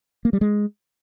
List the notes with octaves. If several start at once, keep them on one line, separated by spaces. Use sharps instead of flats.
A#3
G3
G#3